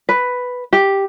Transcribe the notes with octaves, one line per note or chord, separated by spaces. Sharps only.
B4
G4